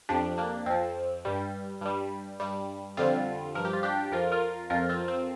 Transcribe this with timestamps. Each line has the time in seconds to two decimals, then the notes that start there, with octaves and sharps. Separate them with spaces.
0.09 F2 F3 D4 G4
0.38 A#3 D4
0.66 F2 F3 C4
1.25 G2 G3
1.81 G2 G3
2.40 G2 G3
2.97 F2 D3 G3 C4 F4
3.55 G2 F3 A#4
3.65 G4
3.73 F4
3.83 D4 G4
4.12 F2 F3 F4 A#4
4.32 F4 A#4
4.70 F2 F3 F4 A#4
4.89 C4 F4
5.08 C4